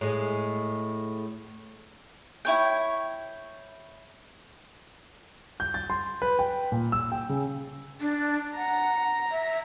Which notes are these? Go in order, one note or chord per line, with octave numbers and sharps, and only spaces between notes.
A2 G#3
E4 C#5 G5
G6
A6
C6
B4
G5
A#2
E6
G5
C#3
D4
F#5 A#5
E5